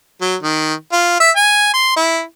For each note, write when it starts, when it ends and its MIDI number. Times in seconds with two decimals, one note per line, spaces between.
0.21 0.36 54
0.43 0.74 51
0.93 1.16 65
1.20 1.31 76
1.36 1.70 80
1.74 1.93 84
1.96 2.22 64